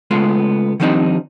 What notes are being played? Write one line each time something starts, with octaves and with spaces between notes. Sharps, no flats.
C#3 G#3 A3 B3 F4
D#3 F3 G3 C4 D4 D#4